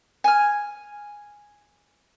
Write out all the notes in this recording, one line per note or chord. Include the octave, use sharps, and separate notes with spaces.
G#5 F6